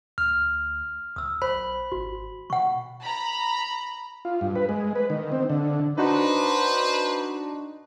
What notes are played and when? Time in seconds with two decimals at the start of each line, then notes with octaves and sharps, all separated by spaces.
0.18 D2 F6
1.16 C#2 D#6 E6
1.42 B1 C5 B5
1.92 G#1 F#4
2.50 B2 F#5 C#6
3.04 A#5 B5
4.25 F4
4.41 G2
4.56 B4
4.69 G#3
4.95 B4
5.10 D#3
5.32 C4
5.50 D3
5.98 D4 D#4 F#4 B4 C5